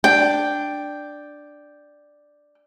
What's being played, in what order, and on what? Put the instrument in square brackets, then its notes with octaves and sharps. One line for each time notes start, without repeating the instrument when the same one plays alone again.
[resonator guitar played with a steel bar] D4 [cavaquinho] G5